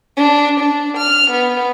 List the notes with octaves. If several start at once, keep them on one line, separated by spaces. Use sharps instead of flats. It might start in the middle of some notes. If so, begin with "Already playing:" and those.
D4
D4
F6
B3